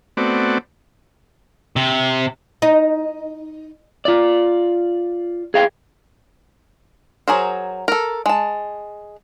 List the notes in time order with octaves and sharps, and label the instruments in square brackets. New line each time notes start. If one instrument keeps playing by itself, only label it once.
[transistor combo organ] A3 B3 C4 F#4 D5
[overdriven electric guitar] C3
[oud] D#4
[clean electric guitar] F4 D5
G#4 F5 G5
[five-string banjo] F#3 G#4 A#4 C5
A4 A#4
G#3 A5